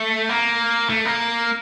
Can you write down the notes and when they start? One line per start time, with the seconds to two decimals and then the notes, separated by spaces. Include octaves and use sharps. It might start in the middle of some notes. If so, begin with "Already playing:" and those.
Already playing: A3
0.29 A#3
0.89 A3
1.05 A#3